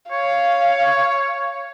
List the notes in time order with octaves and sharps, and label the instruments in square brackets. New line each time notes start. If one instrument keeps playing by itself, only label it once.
[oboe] C#5 [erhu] F5